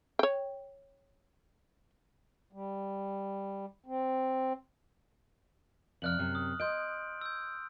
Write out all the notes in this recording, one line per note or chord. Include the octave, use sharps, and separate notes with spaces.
C#5 G5
G3
C4
F2 C3 D5 F6 F#6 F#7
F#2 C3
D#6
D#5 C6 G6 D7
E6 G6